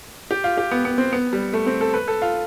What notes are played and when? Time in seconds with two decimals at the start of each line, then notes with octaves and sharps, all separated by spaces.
0.31 G4
0.44 F4
0.57 G4
0.71 B3
0.85 B3
0.98 C4
1.13 B3
1.33 G3
1.53 A3
1.66 C4
1.81 A4
1.94 B4
2.08 A4
2.22 F4